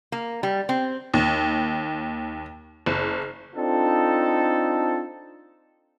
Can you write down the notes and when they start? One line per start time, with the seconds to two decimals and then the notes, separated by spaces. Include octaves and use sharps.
0.12 A#3
0.43 G3
0.69 C4
1.14 D#2
2.86 F#1
3.56 C4 D4 D#4 F4 A4